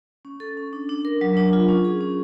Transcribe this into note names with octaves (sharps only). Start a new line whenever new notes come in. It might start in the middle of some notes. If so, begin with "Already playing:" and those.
C#4
A4
C#4
D4
D4
A#4
F#3
D4
F4
C#4
G#4
C#4